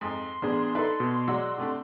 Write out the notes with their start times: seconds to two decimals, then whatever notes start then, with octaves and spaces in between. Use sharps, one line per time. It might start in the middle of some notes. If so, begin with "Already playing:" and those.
0.01 F2 G#2 C6
0.42 A1 B3 D4 G#4
0.75 D#4 A4 B4 D5 E5
1.00 B2
1.28 F#3 G#3 F#4 D5 F#5 E6
1.58 C3 A3 D4